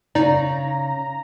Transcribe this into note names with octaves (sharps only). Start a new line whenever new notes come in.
C#3 D#4 D5 A#5